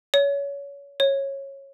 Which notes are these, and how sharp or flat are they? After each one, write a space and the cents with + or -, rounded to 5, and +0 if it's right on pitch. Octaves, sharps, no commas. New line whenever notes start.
C#5 +25
C#5 -15